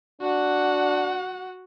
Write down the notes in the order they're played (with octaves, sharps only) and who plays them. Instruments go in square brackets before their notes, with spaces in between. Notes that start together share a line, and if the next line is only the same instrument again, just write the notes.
[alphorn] D4 [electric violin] F#4 F#5